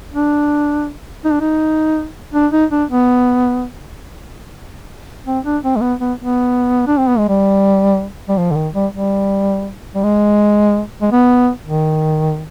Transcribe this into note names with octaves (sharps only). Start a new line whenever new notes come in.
D4
D#4
D4
D#4
D4
D#4
D4
B3
C4
D4
C4
G#3
B3
B3
B3
D4
C4
B3
G#3
G3
G3
F3
D3
D#3
G3
G3
G3
G#3
G#3
B3
D#3